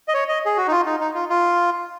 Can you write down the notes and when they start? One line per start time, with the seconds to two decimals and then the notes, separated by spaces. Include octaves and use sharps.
0.08 D#5
0.14 C#5
0.28 D#5
0.45 G#4
0.57 F#4
0.67 D#4
0.71 F4
0.86 D#4
1.01 D#4
1.15 F4
1.30 F4